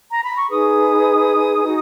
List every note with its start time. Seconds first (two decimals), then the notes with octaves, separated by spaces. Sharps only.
0.10 A#5
0.24 B5
0.37 C#6
0.50 D#4 G#4 B4 D#6
1.63 D#4 F#4